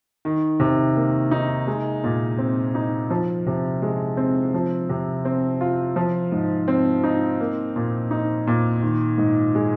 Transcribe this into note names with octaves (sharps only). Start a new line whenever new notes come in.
D#3
C3
A#3
D#4
G#3
A#2
C4
D#4
F3
C3
G#3
C4
F3
C3
C4
F4
F3
G#2
C4
D#4
A#3
A#2
D#4
A#2
D#3
G#2
G#3